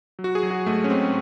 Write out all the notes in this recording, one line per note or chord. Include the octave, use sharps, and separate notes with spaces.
F#3
F#4
G#4
F#3
F#4
G#2 A3
C#4
G#2 C4